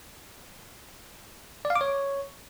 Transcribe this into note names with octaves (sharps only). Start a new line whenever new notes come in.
D5
F5
D6
C#5